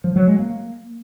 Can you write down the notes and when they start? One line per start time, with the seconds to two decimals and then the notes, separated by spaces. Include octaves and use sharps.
0.04 F3
0.16 F#3
0.27 G#3
0.39 A#3